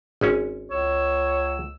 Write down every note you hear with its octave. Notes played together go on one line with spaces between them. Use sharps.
G#1 G#3 C#4
C#2 C#5 E6